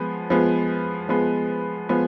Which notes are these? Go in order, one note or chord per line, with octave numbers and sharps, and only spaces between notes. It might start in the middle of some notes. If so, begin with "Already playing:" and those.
Already playing: F3 G#3 B3
F3 G#3 B3
F3 G#3 B3
F3 G#3 B3